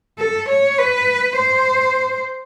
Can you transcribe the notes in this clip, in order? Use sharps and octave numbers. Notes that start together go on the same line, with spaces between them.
A4
C#5
B4
C5